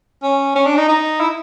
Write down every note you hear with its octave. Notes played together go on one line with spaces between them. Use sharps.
C#4
C#4
D4
D#4
D#4
E4